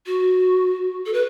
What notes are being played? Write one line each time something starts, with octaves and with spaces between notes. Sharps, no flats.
F#4
A4
B4